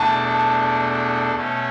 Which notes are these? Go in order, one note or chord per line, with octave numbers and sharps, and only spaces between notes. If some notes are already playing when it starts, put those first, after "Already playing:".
Already playing: E2 B2 A3 D4 A5
B2 A3 C#4